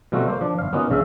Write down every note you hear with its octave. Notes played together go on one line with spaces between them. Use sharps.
B2 G3 A3 C4 F4 F#4
A#3 C5
F3 D4
G1 F5
A#3 B3 C#4 D#4 F4 F#4
A#1 C#3 C#4 E5 F5